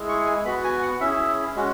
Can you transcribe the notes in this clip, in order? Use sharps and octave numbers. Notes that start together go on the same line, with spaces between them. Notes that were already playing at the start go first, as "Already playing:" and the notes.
Already playing: G#3 E4 G#4
C#6
G#5
B3 F#4 B5
G#5
F#5
C#4 E4 G#4 E5
G#3 C#4 F#4